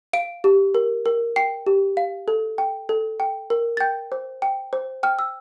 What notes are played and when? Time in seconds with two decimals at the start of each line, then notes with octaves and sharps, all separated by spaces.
0.13 F5 D7
0.44 G4
0.75 A#4
1.06 A#4
1.36 G5 C7
1.66 G4
1.97 F5
2.28 A4
2.58 G5
2.89 A4
3.20 G5
3.50 A#4
3.77 A6
3.80 G5 G6
4.12 C5
4.42 G5
4.73 C5
5.03 G5 F6
5.19 E6